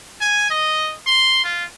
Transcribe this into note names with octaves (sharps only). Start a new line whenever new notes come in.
G#5
D#5
C6
F4